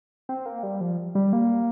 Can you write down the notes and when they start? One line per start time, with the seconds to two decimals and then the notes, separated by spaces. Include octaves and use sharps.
0.29 C4
0.46 A#3
0.63 G3
0.81 F3
1.15 G3
1.33 A#3